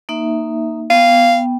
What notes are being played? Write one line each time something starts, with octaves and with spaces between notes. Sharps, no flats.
A#3 D#4 E5
B3 F5 G5